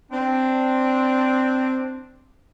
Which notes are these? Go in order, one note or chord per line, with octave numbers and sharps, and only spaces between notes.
C4 D4